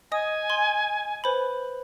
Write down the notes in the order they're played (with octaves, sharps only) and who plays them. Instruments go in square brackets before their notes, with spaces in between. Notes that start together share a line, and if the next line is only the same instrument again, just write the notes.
[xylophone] D#5 D#6 [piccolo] G#5
[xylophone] C6
B4 C5 B5